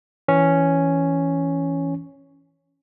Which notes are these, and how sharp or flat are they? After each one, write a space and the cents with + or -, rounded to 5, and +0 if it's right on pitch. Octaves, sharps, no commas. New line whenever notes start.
E3 +0 C#4 +0